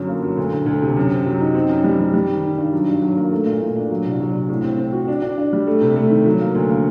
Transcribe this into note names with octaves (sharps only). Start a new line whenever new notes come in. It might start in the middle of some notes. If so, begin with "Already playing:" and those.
Already playing: G1 F#2 F#3
A#3
F#3
D2
D2
D2
C3
F#2
C4
F#3
D#4
C4
F#2
G3
G3
G3
D#3
D#3
G2
F#3
G2
F#3
A#3
A3
A#2
A#2
D4
F#3
C2
F#3
C2
A2
C4
C4
F#4
D4
D4
D4
G3
A3
C3
A3
D#3
F#3
A#3
D2
A#3